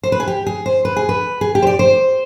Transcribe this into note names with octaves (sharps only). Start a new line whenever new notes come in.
C5
B4
G#4
G4
G#4
C5
B4
G#4
B4
G#4
G4
C5
D5
C5